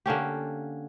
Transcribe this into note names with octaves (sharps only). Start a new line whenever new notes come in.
D3 A#3 C#4 G4